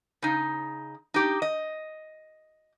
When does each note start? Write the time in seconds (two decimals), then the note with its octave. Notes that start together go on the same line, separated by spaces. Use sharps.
0.22 C#3 D#4
1.14 D#4 G4
1.42 D#5